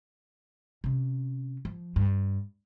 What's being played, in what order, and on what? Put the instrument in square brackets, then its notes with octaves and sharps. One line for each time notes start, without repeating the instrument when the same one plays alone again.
[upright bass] C3 C#4
F3
G2